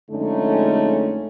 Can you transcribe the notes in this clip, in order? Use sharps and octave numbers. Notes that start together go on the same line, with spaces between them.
F2 D3 G#3 A3 C#4 D#4